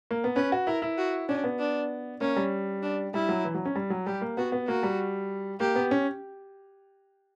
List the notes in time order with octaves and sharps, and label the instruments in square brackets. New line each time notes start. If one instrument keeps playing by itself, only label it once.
[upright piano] A#3
B3
[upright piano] C#4 [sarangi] B4
[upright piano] F#4
[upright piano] E4 [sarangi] A#4
[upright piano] E4
[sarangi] F#4
[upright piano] C#4 [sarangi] D4
[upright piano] B3
[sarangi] D4
[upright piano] A#3 [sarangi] C#4
[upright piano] G3
[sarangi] D4
[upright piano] G3 [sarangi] E4
[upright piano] F#3
E3
F#3
C#4
G3
F#3
[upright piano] G3 [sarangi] G4
[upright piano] A#3
[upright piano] B3 [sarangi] F#4
[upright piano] B3
[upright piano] A#3 [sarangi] F#4
[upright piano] G3
[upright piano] A#3 [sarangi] G4
[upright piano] B3
C#4